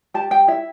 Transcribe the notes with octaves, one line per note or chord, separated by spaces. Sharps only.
G4 A5
G4 G5
E4 E5